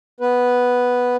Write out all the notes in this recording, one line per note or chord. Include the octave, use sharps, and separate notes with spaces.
B3 B4